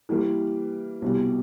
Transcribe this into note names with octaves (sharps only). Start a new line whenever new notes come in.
E3 G3 A#3
C2 B2 G3